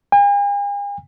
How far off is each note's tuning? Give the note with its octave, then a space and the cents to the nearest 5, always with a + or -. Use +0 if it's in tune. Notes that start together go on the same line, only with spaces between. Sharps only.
G#5 -45